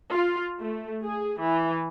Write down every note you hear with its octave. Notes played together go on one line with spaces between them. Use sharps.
F4
A3
G#4
E3